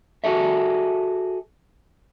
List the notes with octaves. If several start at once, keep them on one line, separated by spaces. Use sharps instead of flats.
F#4 G#4 A4 E5